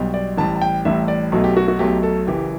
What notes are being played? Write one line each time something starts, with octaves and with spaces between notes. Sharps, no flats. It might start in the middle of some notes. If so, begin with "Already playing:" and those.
Already playing: B1 B2 G3
D5
A1 A2 G3 A5
A5
G5
A1 A2 G3 E5
D5
B1 B2 F#3 A3
G4
F#4
F#4
B1 B2 F#3 A3 G4
A4
F#1 F#2 E3 G4